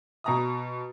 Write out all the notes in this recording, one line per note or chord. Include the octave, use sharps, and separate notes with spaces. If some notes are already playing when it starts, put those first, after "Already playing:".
B2 A#5 D#6